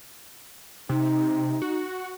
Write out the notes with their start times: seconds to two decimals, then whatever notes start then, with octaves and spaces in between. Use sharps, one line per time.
0.89 C3 D#4
1.62 F#4